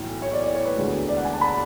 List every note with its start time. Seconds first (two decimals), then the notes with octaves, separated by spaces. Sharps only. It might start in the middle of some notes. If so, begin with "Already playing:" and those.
Already playing: B1 A2 E3
0.22 C#5
0.33 D5
0.44 D5
0.55 C#5
0.65 B4
0.76 E1 D2 D3 G#3
1.09 D5
1.17 F#5
1.25 G#5
1.33 A5
1.41 B5